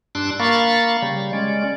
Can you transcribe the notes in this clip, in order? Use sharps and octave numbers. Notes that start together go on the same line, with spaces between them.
G2 D4 C6 D6 E6 F#6
A#3 F5 B5 C#6 A6
C#3 G3
G#3 C#4 D5